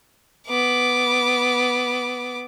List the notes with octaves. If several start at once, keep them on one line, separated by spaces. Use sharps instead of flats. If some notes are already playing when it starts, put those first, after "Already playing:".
B3 D6